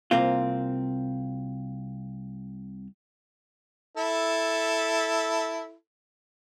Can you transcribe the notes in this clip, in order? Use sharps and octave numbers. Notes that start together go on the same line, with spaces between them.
C2 A#3 C4 F4
E4 A4